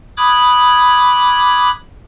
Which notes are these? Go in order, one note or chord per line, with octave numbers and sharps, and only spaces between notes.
B5 D6 D#6 F#6 G#6